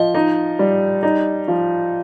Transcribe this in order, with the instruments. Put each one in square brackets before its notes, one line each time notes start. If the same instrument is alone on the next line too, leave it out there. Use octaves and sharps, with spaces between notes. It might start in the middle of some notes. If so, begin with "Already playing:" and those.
Already playing: [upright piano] F3 [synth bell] D#5
[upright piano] D#4
G3
D#4
F3